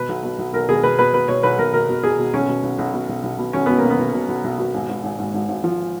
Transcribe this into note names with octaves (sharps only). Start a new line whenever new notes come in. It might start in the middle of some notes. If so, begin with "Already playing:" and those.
Already playing: B2 B4
B1
B2
B1
B1 A#4
B2 G#4
B2 B4
B2 B4
B2 B4
B2 C#5
B1 B4
B1 A#4
B2 A#4
B2
B2 G#4
B2
B1 C#4
B2
B1
B1
B2
B1
B1
B2
B1 C#4
B2 B3
A#3
B1
B3
B1
B2
B1
B1
B2
G#1
G#1
G#1
G#2
G#1
G#1
F3